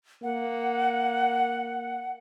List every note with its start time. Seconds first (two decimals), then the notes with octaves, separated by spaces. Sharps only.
0.23 A#3 F#5